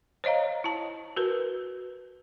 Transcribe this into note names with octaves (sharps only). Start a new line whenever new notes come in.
C5 C#5 D#5 F5 A#5
E4 A5
F#4 A#4 B4